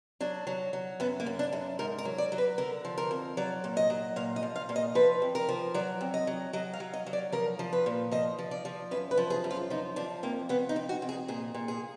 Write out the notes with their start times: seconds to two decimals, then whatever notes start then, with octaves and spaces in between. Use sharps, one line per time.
0.20 F#3 D4
0.47 F#3
0.73 F#3
1.00 F#2 B3
1.20 A#3
1.26 F#2
1.39 D4
1.53 F#2
1.79 G#2 A#4
1.98 A#4
2.05 F#3
2.18 D5
2.32 F#3
2.38 B4
2.58 D3 A#4
2.85 F3
2.98 A#4
3.11 F2
3.37 F#3 D5
3.64 A#2
3.77 D#5
3.90 F#3
4.16 A#2 F5
4.36 D#5
4.43 F3
4.56 F5
4.69 A#2
4.76 D#5
4.95 F3 B4
5.22 F2
5.35 A#4
5.49 F3
5.74 F#3 D5
6.01 F2
6.14 D#5
6.27 F#3
6.53 F#3 D#5
6.73 F5
6.80 F#3
6.93 D#5
7.06 F#3
7.13 D5
7.32 F3 A#4
7.59 F3
7.73 B4
7.86 A#2
8.11 F3 D#5
8.39 F3
8.51 D5
8.65 F3
8.91 F#2 B4
9.11 B4
9.17 F3
9.30 G#4
9.44 F#2
9.51 F4
9.70 F3 D#4
9.96 F3 D4
10.23 F2 A#3
10.49 F2 B3
10.69 D#4
10.76 F2
10.89 F#4
11.02 F2
11.09 G#4
11.28 A#2 G#4
11.54 A#2
11.68 G#4